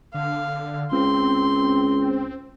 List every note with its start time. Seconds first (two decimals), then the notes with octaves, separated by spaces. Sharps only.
0.14 D3 F5
0.92 C#2 C4 C6